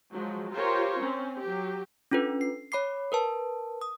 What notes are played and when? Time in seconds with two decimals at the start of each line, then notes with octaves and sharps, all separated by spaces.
0.13 F3 F#3 G#3
0.52 F4 G4 A#4 C5 C#5
1.00 C4 C#4
1.42 F#3 G4
2.11 C#4 D4 F4 A4 B4
2.41 C7
2.72 C#5 B5 D6 C7
3.12 A#4 B4 A5
3.81 D#6